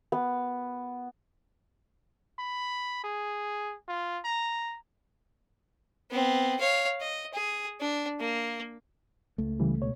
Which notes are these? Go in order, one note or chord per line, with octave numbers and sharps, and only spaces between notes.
B3
B5
G#4
F4
A#5
B3 C4
C#5 F5
D#5
G#4
D4
A#3
C#2 A3
C#3 E3 G3
B2 C#5